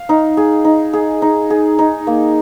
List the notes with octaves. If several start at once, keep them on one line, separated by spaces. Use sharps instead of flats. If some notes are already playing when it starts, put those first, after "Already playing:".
Already playing: F5
D#4
G#4
D#4
G#4
D#4
G#4
D#4
A#3